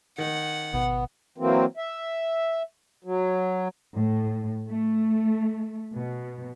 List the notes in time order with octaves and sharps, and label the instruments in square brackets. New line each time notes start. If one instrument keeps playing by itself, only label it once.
[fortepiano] D#3 [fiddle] F#5
[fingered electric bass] G#1 B2 [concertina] B3
[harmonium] E3 F#3 A#3 C4
E5
F#3
[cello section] A2
A3
B2